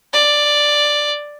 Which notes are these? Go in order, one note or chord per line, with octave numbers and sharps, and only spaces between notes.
D5